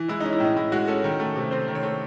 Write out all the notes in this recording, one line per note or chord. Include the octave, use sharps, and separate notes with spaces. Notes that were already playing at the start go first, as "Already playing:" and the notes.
Already playing: E3
G#3 E4
C#4 D#4
E4
A2 D#4
A2 E4
G#3 F#4
C#4 A4
D#3
A3
C3
C4 C5
D#3
C#5
A3